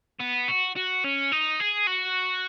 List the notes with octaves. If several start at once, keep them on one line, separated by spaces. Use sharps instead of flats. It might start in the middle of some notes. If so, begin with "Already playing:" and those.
B3
F#4
F#4
C#4
D#4
G#4
F#4